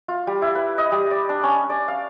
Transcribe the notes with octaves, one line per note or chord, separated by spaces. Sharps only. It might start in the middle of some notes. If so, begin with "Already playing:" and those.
F4
G3
E4
B4
D#5
G3
D5
D4
C#4
D5
F5